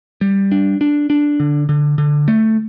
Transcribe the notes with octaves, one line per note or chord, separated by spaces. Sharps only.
G3
D4
D4
D4
D3
D3
D3
A3